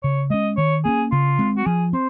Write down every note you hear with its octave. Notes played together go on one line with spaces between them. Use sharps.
C#3 C#5
G#3 C#4 D#5
D#3 C#5
A#3 C#4 G#4
C#3 F4
G#3 C4
F#4
F3 G#4
C4 C5